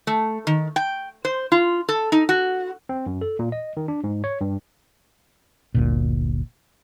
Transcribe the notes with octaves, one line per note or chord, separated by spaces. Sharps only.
A3
D#3
G5
C5
F4
A4
D#4
F#4
C4
F#2
A4
A#2
D#5
D#3
D4
G#2
C#5
G2
G1 D2 A#2